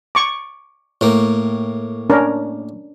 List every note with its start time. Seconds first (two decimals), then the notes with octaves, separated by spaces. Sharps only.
0.15 C#6 D6
1.01 A2 A#3
2.10 C#4 D4 A#4